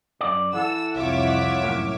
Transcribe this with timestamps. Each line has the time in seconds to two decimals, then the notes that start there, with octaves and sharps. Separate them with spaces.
0.21 F#2 D5
0.53 E3 A4 F#5 E6
0.96 C2 F2 F4 C#5 E5 F#5 D6
1.63 F#2 A2 A#3